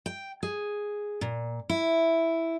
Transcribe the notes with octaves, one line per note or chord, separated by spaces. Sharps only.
G5
G#4
A#2
E4